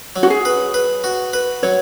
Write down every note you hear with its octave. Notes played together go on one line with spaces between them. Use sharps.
F#3
F#4
G#4
B4
B4
F#4
B4
F#3 C#5